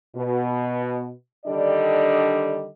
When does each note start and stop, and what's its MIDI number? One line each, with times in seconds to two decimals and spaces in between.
0.15 1.11 47
1.46 2.67 50
1.46 2.67 51
1.46 2.67 55
1.46 2.67 62
1.46 2.67 74
1.46 2.67 75